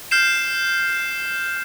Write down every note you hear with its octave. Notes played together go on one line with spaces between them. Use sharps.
F6 G6 C7 E7